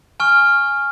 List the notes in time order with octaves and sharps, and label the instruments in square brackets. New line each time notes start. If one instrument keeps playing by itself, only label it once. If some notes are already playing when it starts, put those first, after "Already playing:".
[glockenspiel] G#5 C#6 F6